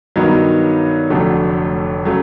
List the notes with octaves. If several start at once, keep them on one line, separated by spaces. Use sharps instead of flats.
G2 D#3 F#3 B3 D#4
F1 F2 D3 F#3 A3
C#3 F#3 A3